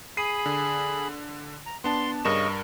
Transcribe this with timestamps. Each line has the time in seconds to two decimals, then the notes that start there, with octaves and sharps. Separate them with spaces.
0.17 G#4 B5 C7 D#7
0.46 D3
1.66 A#5
1.84 B3 D4 A5 C6
2.25 G2 C#3 A#4 D#5 C#6 E7